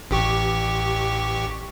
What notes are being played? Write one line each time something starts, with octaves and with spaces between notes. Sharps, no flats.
A1 G4 C#6